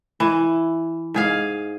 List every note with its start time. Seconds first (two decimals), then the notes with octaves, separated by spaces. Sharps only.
0.20 E3
1.14 G#2 G#4 F5